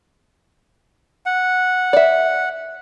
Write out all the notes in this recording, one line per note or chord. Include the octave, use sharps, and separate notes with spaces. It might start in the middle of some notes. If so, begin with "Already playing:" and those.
F#5
D5 E5